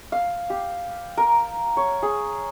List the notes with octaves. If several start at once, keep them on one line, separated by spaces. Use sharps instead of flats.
F5
G4
A#4
C#5
G#4